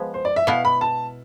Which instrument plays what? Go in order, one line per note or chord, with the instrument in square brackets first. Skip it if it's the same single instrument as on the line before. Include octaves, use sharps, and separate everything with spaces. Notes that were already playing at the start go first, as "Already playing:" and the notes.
Already playing: [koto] F3 G#3 B3
[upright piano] C5
D5
E5
[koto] B2 B3 E4 [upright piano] F5
[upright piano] B5
A5